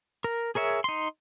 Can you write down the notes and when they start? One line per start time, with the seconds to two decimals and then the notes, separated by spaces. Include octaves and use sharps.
0.24 A#4
0.55 G#4 A#4 C#5 E5
0.84 D#4 C6